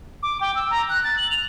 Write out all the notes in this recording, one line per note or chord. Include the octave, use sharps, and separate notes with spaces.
D6
G5
E6
A#5
F#6
A6
F#7
F7